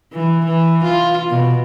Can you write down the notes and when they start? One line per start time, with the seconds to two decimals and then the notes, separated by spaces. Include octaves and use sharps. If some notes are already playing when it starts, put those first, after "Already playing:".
0.13 E3
0.45 E3
0.84 F4
1.30 B2